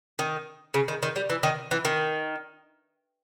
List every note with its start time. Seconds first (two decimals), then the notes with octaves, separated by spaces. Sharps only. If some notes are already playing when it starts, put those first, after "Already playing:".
0.19 D#3
0.74 C#3
0.88 D#3
1.03 D#3
1.16 G3
1.30 E3
1.43 D#3
1.71 E3
1.85 D#3